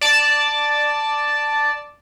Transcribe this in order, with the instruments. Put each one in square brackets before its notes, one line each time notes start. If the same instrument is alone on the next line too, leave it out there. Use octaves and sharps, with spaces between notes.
[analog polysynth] D5 A5